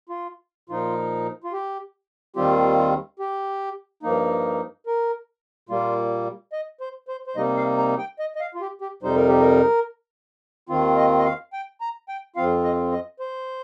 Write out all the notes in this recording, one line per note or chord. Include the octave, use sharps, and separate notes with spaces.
F4
A#2 F3 D#4 F4
F4
G4
D#2 D#3 G3 C4 F4 G4
F4
G4
G2 F3 A#3 D#4
A#4
A#2 G3 A#3 F4
D#5
C5
C5
C5
C3 G3 A#3 D#4 D#5
F5
A#5
G5
D#5
D#5
F5
F4
G4
G4
F2 C3 G3 D#4 C5
A#4
G4
A#4
D#2 D#3 C4 F4
D#5
D#5
F5
G5
A#5
G5
F2 F3 C4 F4 F5
D#5
D#5
C5